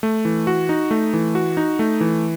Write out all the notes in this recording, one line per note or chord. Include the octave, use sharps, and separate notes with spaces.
A3
E3
F#4
D#4
A3
E3
F#4
D#4
A3
E3